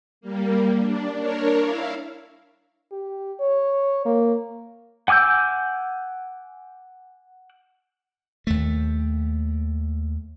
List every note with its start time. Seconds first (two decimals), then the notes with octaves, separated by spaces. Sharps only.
0.21 G3 A#3
0.78 D4
1.18 D4 A#4 C#5
1.59 E4 F5
2.92 G4
3.40 C#5
4.05 A#3
5.08 F#5 G#5 D6 E6 G6
8.47 D#2 A3